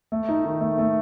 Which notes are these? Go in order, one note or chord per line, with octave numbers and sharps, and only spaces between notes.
A3
D#4
D#3
A3
A3